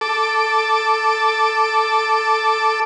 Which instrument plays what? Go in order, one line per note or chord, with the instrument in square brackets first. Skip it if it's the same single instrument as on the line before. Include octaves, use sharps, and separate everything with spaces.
[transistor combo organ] A4 D6